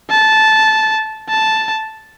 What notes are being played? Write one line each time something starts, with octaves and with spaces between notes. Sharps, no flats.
A5
A5